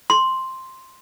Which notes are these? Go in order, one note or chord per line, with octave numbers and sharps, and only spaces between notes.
C6